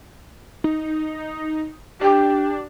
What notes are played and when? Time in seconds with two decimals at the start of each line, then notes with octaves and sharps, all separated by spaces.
0.64 D#4
2.01 D4 G4